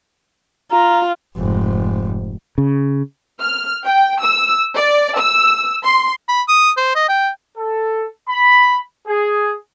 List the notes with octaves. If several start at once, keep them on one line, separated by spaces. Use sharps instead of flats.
F4 A#5
F1 G#2
C#3
F6
G5
E6
D5
E6
C6
B5
D#6
C5
D#5
G5
A4
B5
G#4